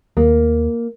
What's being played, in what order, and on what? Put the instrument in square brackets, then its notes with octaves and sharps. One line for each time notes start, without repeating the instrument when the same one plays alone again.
[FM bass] D#2 [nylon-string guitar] A#3